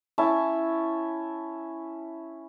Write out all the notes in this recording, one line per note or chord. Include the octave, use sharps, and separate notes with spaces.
C#4 E4 E5 A5